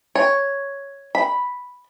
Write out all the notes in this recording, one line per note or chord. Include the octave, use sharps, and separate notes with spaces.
C#5
B5